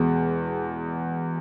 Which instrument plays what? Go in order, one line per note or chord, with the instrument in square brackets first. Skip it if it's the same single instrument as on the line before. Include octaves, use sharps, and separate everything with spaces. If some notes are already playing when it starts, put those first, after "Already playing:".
Already playing: [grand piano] E2 B2 G#3